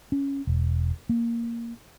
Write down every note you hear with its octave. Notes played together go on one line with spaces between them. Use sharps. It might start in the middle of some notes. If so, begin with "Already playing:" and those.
C#4
E1
A#3